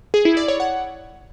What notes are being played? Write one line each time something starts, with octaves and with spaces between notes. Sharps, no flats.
G#4
E4
D5
C#5
F#5